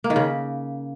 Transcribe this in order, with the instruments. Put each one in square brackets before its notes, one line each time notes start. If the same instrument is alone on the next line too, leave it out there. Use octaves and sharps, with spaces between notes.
[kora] A#3
D#3
C#3